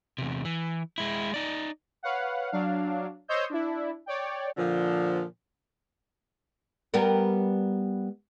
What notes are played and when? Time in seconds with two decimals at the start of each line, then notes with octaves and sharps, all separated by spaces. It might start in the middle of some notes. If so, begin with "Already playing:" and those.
0.18 E2 C3
0.45 E3
0.98 G#3 E4
1.34 D#4 D5
2.03 B4 C#5 F5 F#5
2.52 F#3 D4 F5
3.28 C5 C#5 D#5 D#6 E6 G6
3.50 D4 E4
4.06 C#5 D5 G5
4.57 A#2 D3 F3
6.94 G3 B3 A#4